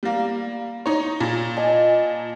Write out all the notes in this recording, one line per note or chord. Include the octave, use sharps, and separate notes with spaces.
G3 A#3
D#4 C#5
A#2
D#5 G#5 A5